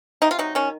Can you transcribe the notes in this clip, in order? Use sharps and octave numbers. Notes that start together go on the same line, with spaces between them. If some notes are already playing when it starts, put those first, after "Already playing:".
C3 D#4
F4
F#3 D#4
D#3 C#4